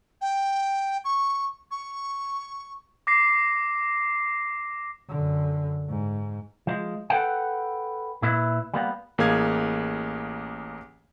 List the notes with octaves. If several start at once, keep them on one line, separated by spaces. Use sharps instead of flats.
G5
C#6
C#6
D6 A#6 C7
F#2 D3
G#2
F3 F#3 G#3
A4 B4 F#5 G5
A#2 E4 B4 E5
G3 A#3 B3
A1 A#3 G#4 F5 G#6